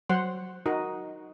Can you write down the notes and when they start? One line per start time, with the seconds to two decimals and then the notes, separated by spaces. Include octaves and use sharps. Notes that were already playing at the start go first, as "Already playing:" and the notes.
0.09 F#3 C5 F#5 C6
0.66 D#4 F#4 A#4 D#5